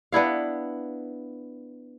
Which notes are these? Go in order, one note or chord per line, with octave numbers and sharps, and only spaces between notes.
B3 D4 E4 F5